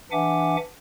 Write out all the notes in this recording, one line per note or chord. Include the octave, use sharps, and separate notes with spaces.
E3 D4 E5 F#5 G#5 D6